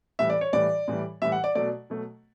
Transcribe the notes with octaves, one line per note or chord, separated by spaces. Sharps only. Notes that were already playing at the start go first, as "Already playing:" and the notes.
A2 E3 G3 E5
D5
C#5
A2 E3 G3 D5
A2 E3 G3
A2 E3 G3 E5
F#5
D5
B2 F#3 A3 D5
B2 F#3 A3